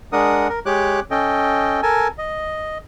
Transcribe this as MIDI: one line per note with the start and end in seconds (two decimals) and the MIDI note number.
0.13 0.48 56
0.13 0.48 62
0.13 0.48 70
0.13 0.48 78
0.13 0.48 87
0.49 0.59 70
0.66 1.00 56
0.66 1.00 67
0.66 1.00 73
0.66 1.00 86
0.66 1.00 90
1.11 1.81 61
1.11 1.81 69
1.11 1.81 75
1.11 1.81 79
1.83 2.08 69
1.83 2.08 70
1.83 2.08 80
1.83 2.08 81
2.18 2.78 75